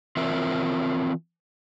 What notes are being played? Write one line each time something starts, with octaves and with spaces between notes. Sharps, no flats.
E3 C4 F4 A#4 E5